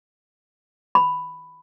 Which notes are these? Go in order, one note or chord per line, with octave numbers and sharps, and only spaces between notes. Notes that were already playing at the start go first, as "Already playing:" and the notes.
B5